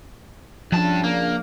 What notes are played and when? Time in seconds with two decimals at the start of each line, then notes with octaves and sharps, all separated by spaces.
0.72 G2 C#3 F3 D4 A5
1.04 A#3